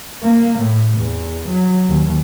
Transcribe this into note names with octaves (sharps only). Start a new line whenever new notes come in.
A#3
A2
E2
F#3
D#2